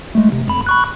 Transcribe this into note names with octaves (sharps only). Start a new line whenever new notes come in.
G#3 A3
C3
F2 B5
B5 C#6 F#6